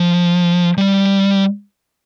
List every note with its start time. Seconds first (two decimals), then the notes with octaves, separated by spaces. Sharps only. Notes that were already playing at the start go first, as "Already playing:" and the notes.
Already playing: F3
0.77 G3